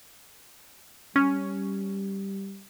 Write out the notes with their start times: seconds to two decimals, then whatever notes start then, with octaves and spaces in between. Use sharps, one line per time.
1.16 G3 C#4